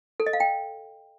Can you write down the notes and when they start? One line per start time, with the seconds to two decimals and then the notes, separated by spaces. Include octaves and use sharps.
0.20 A4
0.26 D#5
0.33 F5
0.40 G5